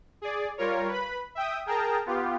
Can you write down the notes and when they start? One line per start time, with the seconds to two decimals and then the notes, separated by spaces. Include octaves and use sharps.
0.22 G#4 D5
0.58 G3 F4 A#4 C#5
0.88 B4 B5
1.35 E5 G5 D#6
1.66 G#4 A#4 G5 A5 A#5
2.06 B3 F4 G4